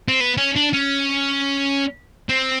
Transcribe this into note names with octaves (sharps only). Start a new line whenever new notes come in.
C4
B3
C#4
D4
C#4
C4